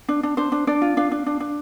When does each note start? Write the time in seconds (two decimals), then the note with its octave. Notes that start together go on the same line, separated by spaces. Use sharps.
0.08 D4
0.23 D4
0.37 D4 C5
0.52 D4
0.67 D4 D5
0.82 F4
0.97 D4 F5
1.12 D4
1.26 D4
1.40 D4